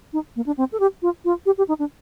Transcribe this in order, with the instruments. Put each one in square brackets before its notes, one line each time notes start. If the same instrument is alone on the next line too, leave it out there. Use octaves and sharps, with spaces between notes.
[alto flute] D#4
A#3
D4
C4
A4
G4
F4
F4
G4
G4
D#4
D4